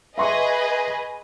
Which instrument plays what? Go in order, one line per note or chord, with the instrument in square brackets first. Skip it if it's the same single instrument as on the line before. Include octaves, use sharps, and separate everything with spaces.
[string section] G#4 B4 D#5 [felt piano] E5 C6 C#6